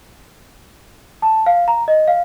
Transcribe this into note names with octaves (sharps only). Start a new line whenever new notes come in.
A5
F5
A#5
D#5
F5